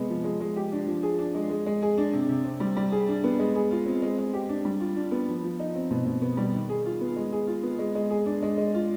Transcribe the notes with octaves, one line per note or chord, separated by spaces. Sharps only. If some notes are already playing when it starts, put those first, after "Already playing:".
Already playing: C3 G#3 B3
F3
G#3
G#3
G4
D4
F3
G#4
D4
G#3
G#3
G#3
G#4
D4
C3
C3
C4
G3
G3
G#4
D4
B3
G#3
G#4
F4
C4
G#3
G#3
G4
D4
G3
F4
D4
B3
F3
F3
D#4
C4
B2
B2
B3
G3
D#3
G#4
F4
B3
G#3
G#4
F4
B3
G#3
G#3
G#4
D4
G#3
G#3
F4